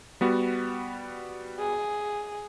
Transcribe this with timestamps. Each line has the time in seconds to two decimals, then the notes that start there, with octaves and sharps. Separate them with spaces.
0.21 G3 B3 F#4
1.59 G#4